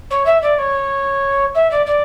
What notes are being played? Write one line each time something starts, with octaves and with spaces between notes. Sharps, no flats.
C#5
E5
D5
C#5
E5
D5
D5